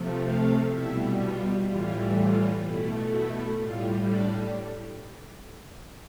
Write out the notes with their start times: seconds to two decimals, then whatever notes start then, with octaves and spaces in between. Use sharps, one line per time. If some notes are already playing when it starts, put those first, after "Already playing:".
Already playing: C3 F3 A3
0.24 F4 F5
0.72 B2 G3 E4 E5
1.20 F4
1.68 A2 E3 G3 F4
2.16 F4
2.64 B2 A3 E4
3.11 E4
3.59 A2 G3 F4
4.06 D4 D5